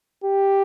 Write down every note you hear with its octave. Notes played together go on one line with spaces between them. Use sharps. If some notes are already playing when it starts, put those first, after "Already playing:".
G4